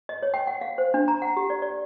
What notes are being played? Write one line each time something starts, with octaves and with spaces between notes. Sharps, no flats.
D#5
C#5
G5
F#5
F5
C5
D4
A#5
F#5
G4
D5
D5